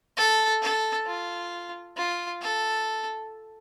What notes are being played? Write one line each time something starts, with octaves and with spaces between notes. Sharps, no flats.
A4
A4
F4
F4
A4